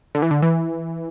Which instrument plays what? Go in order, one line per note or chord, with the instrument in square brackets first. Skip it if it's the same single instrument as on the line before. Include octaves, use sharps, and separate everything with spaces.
[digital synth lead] D3
E3
D3
E3